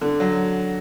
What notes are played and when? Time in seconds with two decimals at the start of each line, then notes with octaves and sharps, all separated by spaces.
0.01 D3
0.20 F#3